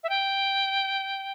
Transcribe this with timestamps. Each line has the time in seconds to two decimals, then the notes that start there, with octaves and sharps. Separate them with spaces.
0.03 E5
0.09 G5